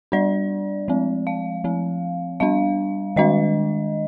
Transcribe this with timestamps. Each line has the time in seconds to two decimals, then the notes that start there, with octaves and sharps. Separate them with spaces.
0.12 G3 D4 D5
0.88 F3 G#3 C4
1.27 F5
1.64 F3 C4
2.40 G3 D4 F5
3.16 D#3 G#3 D4 D#5